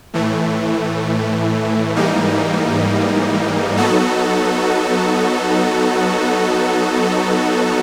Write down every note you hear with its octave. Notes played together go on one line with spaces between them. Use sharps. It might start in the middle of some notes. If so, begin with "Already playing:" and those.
A2 E3 A3
G#2 E3 G3 A#3 D#4
F#3 B3 D#4 F#4 A4